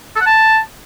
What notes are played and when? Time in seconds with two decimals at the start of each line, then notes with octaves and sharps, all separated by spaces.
0.16 A4
0.21 F#5
0.26 A5